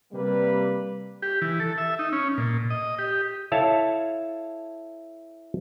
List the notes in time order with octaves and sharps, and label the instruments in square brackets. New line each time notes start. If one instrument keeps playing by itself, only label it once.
[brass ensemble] C3 A#3 B4 [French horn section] G3
[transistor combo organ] G4
E3
A4
E5
D#4
C#4
A#2
D#5
G4
[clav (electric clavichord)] E4 A4 C#5 F5 A5